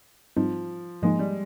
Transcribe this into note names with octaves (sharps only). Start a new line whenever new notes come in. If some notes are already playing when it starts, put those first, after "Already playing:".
G#2 F3 G3 C4 D#4
G#2 F3 G#3 A#3 D#4
G3